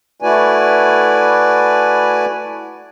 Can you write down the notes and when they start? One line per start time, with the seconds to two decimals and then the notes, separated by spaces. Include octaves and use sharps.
0.22 A3 E4 F#4 B4 D5 G#5